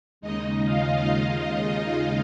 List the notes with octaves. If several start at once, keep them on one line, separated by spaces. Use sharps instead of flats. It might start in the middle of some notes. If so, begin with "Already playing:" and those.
D#2 C#3 G#3 D#4 D#5
F4 F5
F4 F5
F4 F5